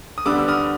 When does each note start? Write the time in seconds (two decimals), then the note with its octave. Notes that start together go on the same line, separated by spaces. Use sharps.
0.18 D#6
0.26 D3 G3 B3 D4 D6 E6
0.38 E6
0.48 D#6 F6